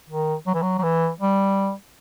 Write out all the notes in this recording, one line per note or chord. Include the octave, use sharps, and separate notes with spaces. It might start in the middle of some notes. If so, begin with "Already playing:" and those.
D#3
F#3
E3
F#3
F#3
E3
G3